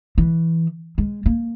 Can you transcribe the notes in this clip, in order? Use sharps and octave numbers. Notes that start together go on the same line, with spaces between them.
E3
G#3
A#3